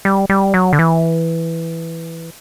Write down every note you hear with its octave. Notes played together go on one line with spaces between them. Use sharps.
G3
G3
F#3
D3
E3